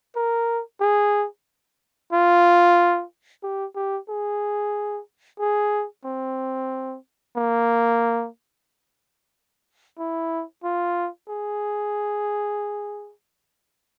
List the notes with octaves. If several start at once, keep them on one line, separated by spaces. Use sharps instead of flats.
A#4
G#4
F4
G4
G4
G#4
G#4
C4
A#3
E4
F4
G#4